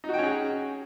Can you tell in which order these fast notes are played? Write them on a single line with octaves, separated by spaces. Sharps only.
D#4 F#4 G5 C#4 G#4